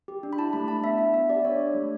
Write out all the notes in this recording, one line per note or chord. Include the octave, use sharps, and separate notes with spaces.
G4
D4
B5
E4 A5
A3 B5
D4 A5
B3 E5
D4 E5
B3 E5
G4 D5
D4 C#5
D4
A3